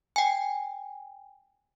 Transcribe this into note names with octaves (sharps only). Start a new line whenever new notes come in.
G5 G#5